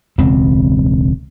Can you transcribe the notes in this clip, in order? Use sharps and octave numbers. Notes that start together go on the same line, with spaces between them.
E1 C#2 C4